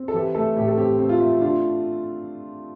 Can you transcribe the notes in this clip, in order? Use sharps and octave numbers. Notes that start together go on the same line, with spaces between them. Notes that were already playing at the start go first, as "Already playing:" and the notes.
Already playing: C4
A4
E3 G4
A3 A4
A2 G4
A4
C4 G4
C4
F4
A3
D4 F4